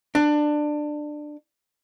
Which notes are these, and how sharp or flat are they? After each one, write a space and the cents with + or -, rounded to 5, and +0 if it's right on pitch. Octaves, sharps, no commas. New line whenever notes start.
D4 +20